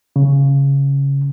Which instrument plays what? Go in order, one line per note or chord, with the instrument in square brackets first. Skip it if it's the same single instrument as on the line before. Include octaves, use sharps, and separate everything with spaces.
[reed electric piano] C#3